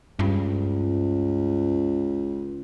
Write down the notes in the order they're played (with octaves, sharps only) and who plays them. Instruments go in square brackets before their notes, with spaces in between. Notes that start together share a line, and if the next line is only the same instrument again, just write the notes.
[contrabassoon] C#2 [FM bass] G2